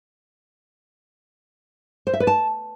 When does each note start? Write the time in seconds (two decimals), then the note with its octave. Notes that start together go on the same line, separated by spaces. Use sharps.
2.07 C5
2.14 E5
2.20 B4
2.27 A5